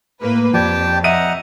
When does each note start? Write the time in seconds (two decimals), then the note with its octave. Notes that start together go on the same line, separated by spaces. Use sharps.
0.21 A2 A#3 B4
0.54 F2 F3 G4 D5 G5 A5 G#6
1.04 D#5 E5 F#5 A#5 D#7